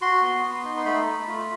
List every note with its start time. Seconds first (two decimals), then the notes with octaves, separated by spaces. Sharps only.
0.01 F#4 C6
0.22 B3
0.44 B3
0.64 D#4
0.77 C6
0.85 A3 B5
1.06 A3
1.27 F4